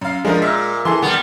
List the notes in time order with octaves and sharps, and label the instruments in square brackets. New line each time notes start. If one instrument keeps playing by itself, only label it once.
[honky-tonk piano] F#2 F5
[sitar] F3 [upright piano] G#3 [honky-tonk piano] D4 A#4 D#5
[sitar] A#2 [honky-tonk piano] E5 B6
[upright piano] E3 [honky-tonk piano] G#4 A4 C6
[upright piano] D#3 [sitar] G3 B3